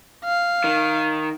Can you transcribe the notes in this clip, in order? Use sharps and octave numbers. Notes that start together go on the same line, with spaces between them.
F5
D#3